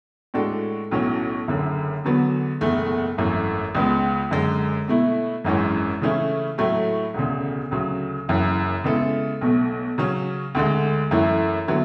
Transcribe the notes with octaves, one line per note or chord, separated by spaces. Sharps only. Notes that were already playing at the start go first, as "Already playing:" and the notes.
A2 G#3 D4 F#4 A4
B1 A2 F#3 C#4
F#1 F#2 D3
E2 D3 F#3 B3
F#1 E2 B2 A3
G#1 F#2 E3 A3
C#2 C#3 G#3 B3
F#2 D3 G#3
B2 A3 E4
G#1 F#2 E3 G#3 C#4
C#3 E3 A3 C#4 E4
A2 F#3 A3 E4
E1 D2 C#3
D2 C#3 F#3
F#1 F#2 E3
C#3 G#3 B3 E4 A4
B1 B2 A3
C#3 F#3 C#4
D2 D3 G#3
F#2 E3 A3 E4
D3 F#3 B3 E4